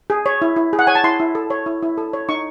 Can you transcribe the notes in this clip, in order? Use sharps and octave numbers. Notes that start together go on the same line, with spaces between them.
G#4
C#5
E4
E4
G#4
F#5
C#5 G#5
A5
E4 C6
E4
A4
C#5
E4
E4
A4
C#5
D#4 C#6